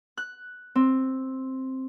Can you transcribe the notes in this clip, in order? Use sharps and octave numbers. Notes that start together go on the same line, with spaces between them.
F#6
C4